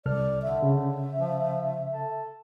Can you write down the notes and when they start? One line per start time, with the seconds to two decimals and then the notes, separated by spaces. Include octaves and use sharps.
0.06 C2 A4 D5 F6
0.42 D3 E5
0.62 C#3 E5
1.19 F3
1.91 A4